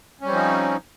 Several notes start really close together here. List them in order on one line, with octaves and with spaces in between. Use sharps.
C#4 G3 C4 F3 D#4